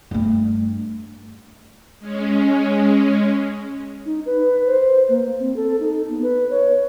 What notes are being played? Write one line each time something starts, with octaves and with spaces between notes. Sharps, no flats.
G2 A3
G#3 C#4
D#4
B4
C5
A#3
C4
A4
D#4
B3
B4
C#5